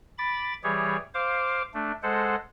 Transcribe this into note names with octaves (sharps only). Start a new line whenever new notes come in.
B5 D6 A6
E3 G3 G4 G#4 C#5
C5 F5 D6
A3 D4
G#3 A4 C5 F#5